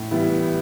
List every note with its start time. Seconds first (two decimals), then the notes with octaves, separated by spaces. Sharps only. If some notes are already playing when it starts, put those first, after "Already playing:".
Already playing: A2
0.11 E3 G3 B3 E4